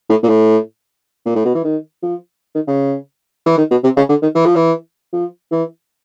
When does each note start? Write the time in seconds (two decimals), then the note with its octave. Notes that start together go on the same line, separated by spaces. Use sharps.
0.09 A2
0.23 A#2
0.29 A2
1.26 A#2
1.35 A2
1.45 B2
1.55 E3
1.64 D#3
2.03 F3
2.55 D#3
2.68 C#3
3.46 E3
3.58 D#3
3.71 B2
3.84 C3
3.97 C#3
4.09 D3
4.22 D#3
4.35 E3
4.46 F3
4.56 E3
5.13 F3
5.52 E3